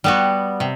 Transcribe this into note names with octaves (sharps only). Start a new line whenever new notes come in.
G3 B3 F#4
C3